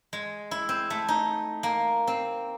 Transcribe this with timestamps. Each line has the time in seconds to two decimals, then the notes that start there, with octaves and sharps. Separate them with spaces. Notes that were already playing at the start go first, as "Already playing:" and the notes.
0.13 G#3
0.51 E4
0.69 C4
0.90 A3
1.08 D#4
1.63 A#3
2.07 C4